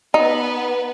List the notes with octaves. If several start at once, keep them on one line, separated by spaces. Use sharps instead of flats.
B3 D#4 B4